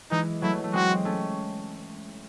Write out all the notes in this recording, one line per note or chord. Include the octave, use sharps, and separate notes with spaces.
E3 G#3 D#4
F#3 A3 E4
A3
G#3 C4 F#4
A3 C#4